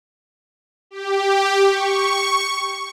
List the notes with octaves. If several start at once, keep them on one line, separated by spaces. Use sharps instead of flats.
G4
C#6